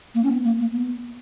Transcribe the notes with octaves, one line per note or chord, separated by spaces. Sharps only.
A#3
C#4
B3
A#3
A#3
B3